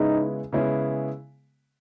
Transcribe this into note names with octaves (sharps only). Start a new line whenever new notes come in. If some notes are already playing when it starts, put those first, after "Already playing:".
Already playing: C#3 G#3 B3 D#4 E4 G#4
C#3 G#3 B3 E4 G#4